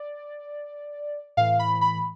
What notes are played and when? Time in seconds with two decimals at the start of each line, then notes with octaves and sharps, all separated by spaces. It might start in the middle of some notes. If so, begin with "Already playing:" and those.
Already playing: D5
1.37 A2 E3 F5
1.59 B5
1.81 B5